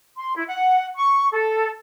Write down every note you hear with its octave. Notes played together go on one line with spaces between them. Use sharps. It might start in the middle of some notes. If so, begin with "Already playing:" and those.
C6
E4
F#5
C#6
A4